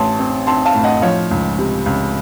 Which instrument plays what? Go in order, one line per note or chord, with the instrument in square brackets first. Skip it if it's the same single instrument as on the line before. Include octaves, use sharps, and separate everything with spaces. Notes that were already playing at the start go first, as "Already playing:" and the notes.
Already playing: [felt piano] A1 A5 C6
C4
C4 A5 C6
F5 A5
A2
D#5 F#5
F3 C#5 F5
C#2
C3
C#2